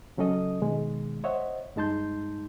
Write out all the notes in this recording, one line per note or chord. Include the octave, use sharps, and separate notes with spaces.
C#3 F#3 C#4 A4 D#5 D#6
B2 D#3 G#3
C5 C#5 D#5 E5 F#5
G2 G#3 D#4 A5 C6 G6